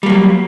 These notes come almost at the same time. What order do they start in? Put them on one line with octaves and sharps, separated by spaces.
G3 A#3 F#3